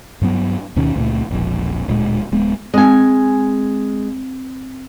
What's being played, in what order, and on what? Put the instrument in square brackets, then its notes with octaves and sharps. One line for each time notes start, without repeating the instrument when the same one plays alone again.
[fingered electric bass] G2 F#3 B3
D2 B2 D#3 C#4
C#2 A#2 A3
E1 A#1
D1 A#2 G#3
D1 G#3 B3
[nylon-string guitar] G#3 G#5 [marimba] C4